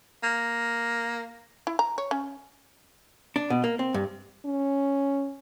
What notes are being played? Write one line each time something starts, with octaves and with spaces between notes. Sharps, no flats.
A#3
E4
A#5
C#5
C#4
D4
B2
A#3
C4
G2
C#4